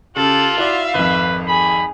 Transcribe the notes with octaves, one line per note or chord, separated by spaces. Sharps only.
C#3 F4 G4 A4 F#6
E4 F#4 D5 E5 F5
G#1 F2 B4
G#4 B5